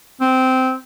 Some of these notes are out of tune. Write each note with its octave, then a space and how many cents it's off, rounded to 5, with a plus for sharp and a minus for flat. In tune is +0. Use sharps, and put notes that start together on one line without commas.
C4 -15